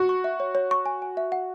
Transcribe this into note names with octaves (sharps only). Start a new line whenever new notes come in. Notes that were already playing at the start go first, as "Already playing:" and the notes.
Already playing: F#4
C#6
E5
C#5
C#5
C#6
G#5
G#5
E5
F#5